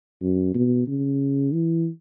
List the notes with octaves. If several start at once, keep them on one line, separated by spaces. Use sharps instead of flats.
F#2
B2
C#3
E3